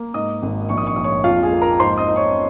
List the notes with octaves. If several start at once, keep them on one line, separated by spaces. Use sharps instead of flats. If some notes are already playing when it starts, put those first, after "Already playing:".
Already playing: A#3
G#2 D#5 D#6
G#1
A#1 C#6
D#6
C#6
A#1 D#6
C#5 C#6
F2 F4 F5
G#4 G#5
A#3
A#4 A#5
G#2 C5 C6
D#5 D#6
D#4
C#5 C#6